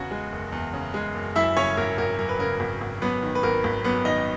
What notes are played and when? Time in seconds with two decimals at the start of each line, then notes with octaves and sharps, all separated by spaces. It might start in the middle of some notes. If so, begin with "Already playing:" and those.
Already playing: E2 C#3 F#4 F#5
0.11 G#3
0.32 F#1
0.52 E2
0.74 C#3
0.94 G#3
1.15 F#1
1.36 F#2 E4 E5
1.57 C#3 C#4 C#5
1.77 G#1 A#4
1.98 G#1 A#4
2.19 F#2 A#4
2.29 B4
2.39 C#3 A#4
2.60 G#1
2.81 G#1
3.02 F#2 B3 B4
3.23 D#3
3.35 B4
3.43 G#1 A#4
3.64 G#1
3.84 F#2 B3 B4
4.05 D#3 D#4 D#5